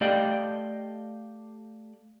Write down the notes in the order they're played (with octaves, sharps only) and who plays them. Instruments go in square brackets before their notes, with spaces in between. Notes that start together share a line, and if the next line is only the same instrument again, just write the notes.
[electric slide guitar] A3 G4 D5 D#5 F5 G5